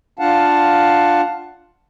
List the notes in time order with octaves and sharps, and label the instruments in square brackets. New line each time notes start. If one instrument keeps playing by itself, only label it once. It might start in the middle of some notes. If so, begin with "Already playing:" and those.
[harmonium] D4 F4 F5 F#5 A5